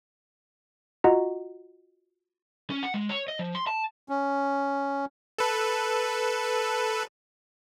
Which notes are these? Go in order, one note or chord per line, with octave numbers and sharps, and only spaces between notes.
F4 F#4 D#5 F#5 A#5
C#4
F#5
G#3
C#5
D#5
F3
C6
A5
C#4
A4 B4